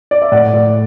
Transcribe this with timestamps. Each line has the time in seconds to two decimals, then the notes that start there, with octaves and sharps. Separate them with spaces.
0.11 D5
0.22 E5
0.32 A2 D5 F#5
0.53 A2